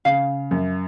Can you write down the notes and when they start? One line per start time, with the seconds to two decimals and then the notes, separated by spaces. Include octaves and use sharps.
0.05 C#3 F5
0.51 F#2